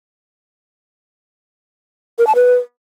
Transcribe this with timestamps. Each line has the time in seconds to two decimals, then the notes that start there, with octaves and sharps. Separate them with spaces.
2.19 A#4
2.27 A5
2.35 B4